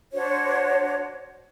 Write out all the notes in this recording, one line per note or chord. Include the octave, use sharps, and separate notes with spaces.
D4 F#4 C5 C#5